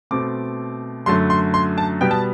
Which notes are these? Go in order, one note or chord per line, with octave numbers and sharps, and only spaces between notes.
B2 A3 C4 D6
F#2 D3 F#3 A3 C6
C6
C6
A5
B2 G3 B3 G5
A5